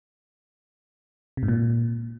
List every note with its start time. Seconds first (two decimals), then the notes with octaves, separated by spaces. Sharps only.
1.37 C3
1.43 G#2
1.48 A#2